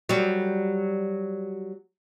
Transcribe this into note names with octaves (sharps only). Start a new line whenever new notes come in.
F#3 G3